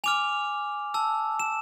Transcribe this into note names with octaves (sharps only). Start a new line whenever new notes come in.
G#5 D6 F6 F7
A5 E6
E7